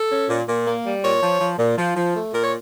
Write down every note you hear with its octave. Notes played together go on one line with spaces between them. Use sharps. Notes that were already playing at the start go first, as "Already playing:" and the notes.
Already playing: A4
C#4
A#2
A#2
A#3
G3
A#2 C#5
F3
F3
A#2
F3
F3
A3
A#2 A#4
C#5